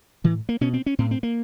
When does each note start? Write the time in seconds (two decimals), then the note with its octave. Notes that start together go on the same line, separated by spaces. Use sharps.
0.24 A2 E3
0.49 A#3
0.61 B2 C#4
0.73 C4
0.86 C#4
0.98 A2 C4
1.11 C4
1.23 A#3